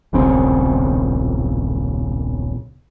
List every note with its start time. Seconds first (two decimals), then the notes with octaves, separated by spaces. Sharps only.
0.13 D#1 B1 C#3 C4